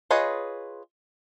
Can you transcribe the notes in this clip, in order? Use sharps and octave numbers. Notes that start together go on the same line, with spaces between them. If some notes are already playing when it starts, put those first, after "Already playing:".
F4 G#4 B4 C#5 D#5